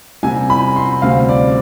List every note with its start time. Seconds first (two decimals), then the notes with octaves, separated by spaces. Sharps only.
0.23 C2 C3 G3 G#5
0.50 B5
0.76 C6
1.02 D2 C3 G3 C4 F5
1.29 D5